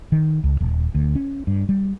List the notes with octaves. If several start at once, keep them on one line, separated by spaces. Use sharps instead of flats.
D#3
C#2
D#1
D2
C#4
G2
G3